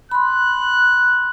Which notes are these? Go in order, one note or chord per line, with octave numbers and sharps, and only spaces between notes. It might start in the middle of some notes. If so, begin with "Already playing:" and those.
B5 C6 F#6